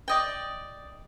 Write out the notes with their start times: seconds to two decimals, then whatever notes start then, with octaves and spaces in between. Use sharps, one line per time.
0.08 D5 D#5 G5